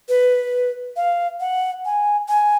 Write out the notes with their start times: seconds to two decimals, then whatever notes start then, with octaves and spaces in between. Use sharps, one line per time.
0.09 B4
0.96 F5
1.40 F#5
1.85 G#5
2.29 G#5